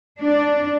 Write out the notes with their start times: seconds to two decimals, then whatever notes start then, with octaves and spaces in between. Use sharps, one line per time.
0.20 D4